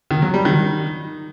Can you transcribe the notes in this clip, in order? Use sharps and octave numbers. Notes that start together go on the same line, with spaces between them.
D#3
F#3
G3
D#3